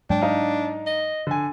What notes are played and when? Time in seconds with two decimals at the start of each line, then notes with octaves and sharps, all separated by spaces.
0.10 G#2 F#3 G#3 D4 G5
0.21 D#4 F5
0.87 D#5
1.27 D3 G#5